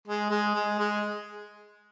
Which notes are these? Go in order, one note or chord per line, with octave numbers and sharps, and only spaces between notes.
G#3
G#3
G#3
G#3